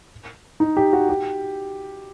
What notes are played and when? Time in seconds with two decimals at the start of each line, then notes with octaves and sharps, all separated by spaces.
0.60 D#4
0.77 G4
0.93 F#4
1.09 G4